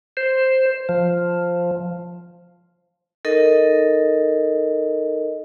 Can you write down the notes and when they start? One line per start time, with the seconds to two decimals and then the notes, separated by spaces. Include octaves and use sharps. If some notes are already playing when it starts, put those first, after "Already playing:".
0.17 C5
0.89 F3
3.25 D#4 A4 A#4 D#5